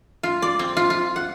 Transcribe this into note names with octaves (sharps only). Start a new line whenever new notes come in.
F4
D5
C4
F4
F4
F#5